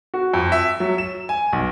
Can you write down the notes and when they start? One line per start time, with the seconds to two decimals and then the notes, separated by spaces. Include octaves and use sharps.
0.14 F#4
0.33 F2
0.52 E5
0.80 F#3
0.98 E7
1.29 G#5
1.53 B1